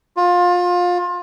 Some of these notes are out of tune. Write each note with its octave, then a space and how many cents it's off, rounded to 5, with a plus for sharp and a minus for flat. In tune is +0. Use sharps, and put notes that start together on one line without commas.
F4 +25